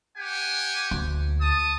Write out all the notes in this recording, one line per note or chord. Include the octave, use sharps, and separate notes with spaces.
G4 F#5 G#5
D2
A5 D#6